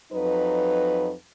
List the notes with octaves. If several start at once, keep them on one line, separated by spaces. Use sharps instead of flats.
F2 F#3 D#4 B4